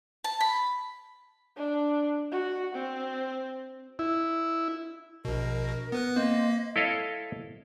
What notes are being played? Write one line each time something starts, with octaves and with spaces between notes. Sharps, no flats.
A5
B5
D4
F#4
C4
E4
A#1 B2 A#4
B3 B4 F#6
A#3 C4 D#5
E4 A4 C#5 D#5 F5